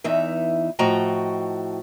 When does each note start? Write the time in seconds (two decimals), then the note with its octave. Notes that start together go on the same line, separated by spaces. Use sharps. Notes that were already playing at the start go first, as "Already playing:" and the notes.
0.04 E2 E3 D#4 E5
0.79 A2 F3 F#4 D#5 G5 A#5